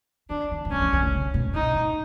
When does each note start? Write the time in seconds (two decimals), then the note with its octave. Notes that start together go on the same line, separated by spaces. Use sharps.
0.30 D#3 D4
0.51 D#3
0.65 E3
0.71 D#3 C#4
0.81 E3
0.93 D#3
1.03 D3
1.12 C#3
1.34 B2
1.54 A#2 D#4
1.75 A#2